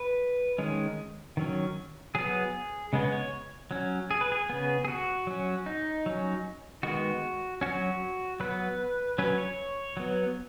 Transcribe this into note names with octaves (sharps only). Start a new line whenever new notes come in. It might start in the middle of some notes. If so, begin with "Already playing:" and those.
Already playing: B4
D#3 G#3 C#4
D#3 F#3 C#4
F#3 B3 G#4
C#3 G#3 B3
C#5
F#3 C#4
G#4
B4
G#4
C#3 B3
G#4
F#4
F#3 C#4
D#4
F#3 C#4
D#3 G#3 B3 F#4
F#3 C#4 F#4
F#3 B3 B4
F#3 C#4 B4
C#5
F#3 B3